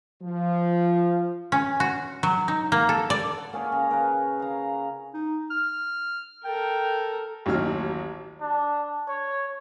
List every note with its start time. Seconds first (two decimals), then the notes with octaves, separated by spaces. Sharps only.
0.22 F3
1.52 C#4
1.80 F#4
2.23 F#3
2.48 D#4
2.72 A#3
2.89 A4
3.10 D5
3.38 F#5
3.53 A#2 C#4 G#4 C#5
3.72 C#3 G#4 A#5
3.91 A#4 B4 C#5
4.40 F5 A#5
5.14 D#4
5.51 F6
6.44 A4 A#4 G5
7.46 A1 D#2 F#3 F6
8.41 D4
9.08 C#5